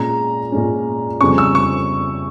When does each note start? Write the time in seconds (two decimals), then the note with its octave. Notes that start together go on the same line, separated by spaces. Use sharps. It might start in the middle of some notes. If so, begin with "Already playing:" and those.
Already playing: A#2 G#3 C#4 A#5
0.52 A#2 G#3 C#4
1.21 F2 C#3 G3 C#4 C#6
1.38 E6
1.55 C#6